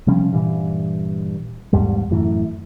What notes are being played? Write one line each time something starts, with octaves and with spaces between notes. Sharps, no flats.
C3 F3 G3 C#4
G2 A#2 E3
A#1 E2 G#2 G3
F#2 A2 E3